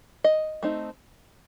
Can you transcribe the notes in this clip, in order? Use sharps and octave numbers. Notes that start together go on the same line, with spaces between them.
D#5
A3 C4 D#4